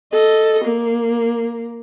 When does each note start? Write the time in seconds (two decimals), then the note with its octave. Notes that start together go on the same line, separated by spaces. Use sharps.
0.13 A4 D#5
0.64 A#3